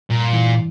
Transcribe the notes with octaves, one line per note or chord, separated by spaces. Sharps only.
G2 A#2
E3